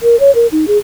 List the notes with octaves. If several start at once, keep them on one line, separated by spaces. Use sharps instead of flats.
A#4
C#5
A#4
D#4
G#4